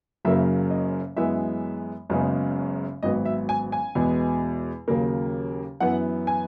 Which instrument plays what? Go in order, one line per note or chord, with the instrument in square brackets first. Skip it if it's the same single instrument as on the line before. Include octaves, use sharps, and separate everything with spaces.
[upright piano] F#1 F#2 C#3 F#3 A#3 E5
D#5
F#2 E3 G#3 B3 E5
F#1 F#2 C#3 G#3 B3
G#1 G#2 F#3 B3 D#5
E5
G#5
G#5
E2 B2 G#3 B3
D#2 C#3 F#3 A#3
F#2 E3 B3 F#5
G#5